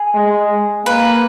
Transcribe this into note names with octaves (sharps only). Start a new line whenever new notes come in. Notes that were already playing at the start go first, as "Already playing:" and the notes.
Already playing: G#4
G#3
A#3 B4